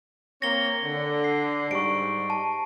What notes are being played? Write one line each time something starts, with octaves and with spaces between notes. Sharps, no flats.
A#3 C4 C#5 A#6 G7
D3
C7
G#2 G3 C#6 D7
A5